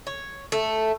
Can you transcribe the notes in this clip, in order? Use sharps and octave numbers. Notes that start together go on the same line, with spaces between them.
C#5
A3